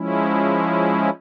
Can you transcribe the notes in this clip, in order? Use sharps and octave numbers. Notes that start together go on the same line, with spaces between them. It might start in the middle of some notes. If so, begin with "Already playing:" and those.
Already playing: F3 G#3 C#4 E4